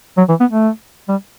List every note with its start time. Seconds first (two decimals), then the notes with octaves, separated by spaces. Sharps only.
0.17 F#3
0.29 E3
0.40 B3
0.51 A3
1.08 G3